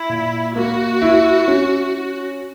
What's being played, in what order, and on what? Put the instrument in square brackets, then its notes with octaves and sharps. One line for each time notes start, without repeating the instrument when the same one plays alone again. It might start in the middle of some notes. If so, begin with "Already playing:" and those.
Already playing: [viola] E4
[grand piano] A#2
[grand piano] A#3 [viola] F#4
[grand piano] E4
C#4